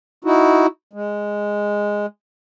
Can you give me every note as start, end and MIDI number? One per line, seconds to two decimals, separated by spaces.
0.24 0.67 63
0.24 0.67 64
0.24 0.67 66
0.93 2.06 56